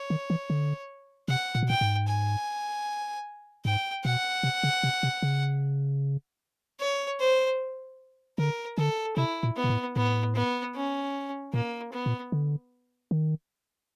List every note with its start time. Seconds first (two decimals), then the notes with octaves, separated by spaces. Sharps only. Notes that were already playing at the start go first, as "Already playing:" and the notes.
Already playing: C#5
0.10 D#3
0.30 E3
0.50 D3
1.28 C3 F#5
1.55 A#2
1.63 B2
1.68 A#2 G5
1.81 G#2
2.08 G#5
3.65 G#2 G5
4.04 B2 F#5
4.43 C3
4.63 C#3
4.83 C3
5.03 C3
5.23 C#3
6.80 C#5
7.20 C5
8.38 D3 A#4
8.78 D3 A4
9.16 C3 E4
9.43 A#2
9.56 B3
9.64 A#2
9.70 A2
9.96 A2 B3
10.35 B3
10.75 C#4
11.53 A#2 A#3
11.92 B3
12.06 A#2
12.32 D3
13.11 D#3